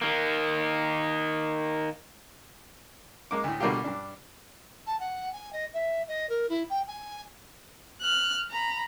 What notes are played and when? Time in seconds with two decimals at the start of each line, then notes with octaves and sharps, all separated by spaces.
0.01 D#3 A#3
3.31 G#3 A#3 D6
3.44 D2 A2
3.60 B2 D3 G3 A#3 F4 G4
3.84 G2 D4
4.86 A5
5.00 F#5
5.32 G#5
5.52 D#5
5.73 E5
6.07 D#5
6.29 A#4
6.49 E4
6.69 G5
6.87 G#5
8.02 F6 F#6
8.51 A#5 B5